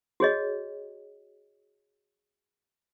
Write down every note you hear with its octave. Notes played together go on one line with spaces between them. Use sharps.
F#4 G#4 C#5 D#5